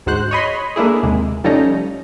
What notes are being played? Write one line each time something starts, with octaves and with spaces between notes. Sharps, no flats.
D2 G#2 F#4 C5 F#6
C#5 D#5 B5 C6
A3 A#3 D4 E4 G#4
D#2 C3 G#3
F3 G3 A3 C#4 D#4